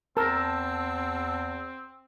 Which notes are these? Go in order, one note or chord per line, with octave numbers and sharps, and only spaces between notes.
E2 C4 A#4 A5 E6